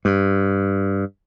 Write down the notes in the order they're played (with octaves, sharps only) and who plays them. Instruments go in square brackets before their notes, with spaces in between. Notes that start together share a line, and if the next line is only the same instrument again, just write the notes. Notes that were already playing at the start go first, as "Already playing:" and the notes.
[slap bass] G2